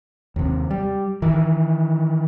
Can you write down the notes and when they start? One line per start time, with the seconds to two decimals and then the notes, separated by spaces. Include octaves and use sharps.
0.36 D#2 C3
0.71 G3
1.22 D#3 E3